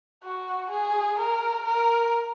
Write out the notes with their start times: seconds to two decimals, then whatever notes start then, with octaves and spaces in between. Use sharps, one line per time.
0.24 F#4
0.71 G#4
1.19 A#4
1.66 A#4